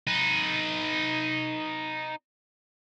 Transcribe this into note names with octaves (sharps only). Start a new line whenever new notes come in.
D#4 B4